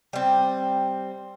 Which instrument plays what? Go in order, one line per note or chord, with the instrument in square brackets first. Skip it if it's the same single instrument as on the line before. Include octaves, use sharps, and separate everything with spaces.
[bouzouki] G3 C4